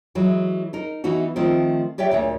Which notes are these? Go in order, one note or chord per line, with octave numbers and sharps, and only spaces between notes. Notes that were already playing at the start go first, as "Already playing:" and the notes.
E3 F#3 G#3
D#4 A#4
E3 B3 D#4 F#4
D#3 F3 A3 C4 D#4 A#4
G4 C#5 D5 E5 G5
D2 A#2 C#5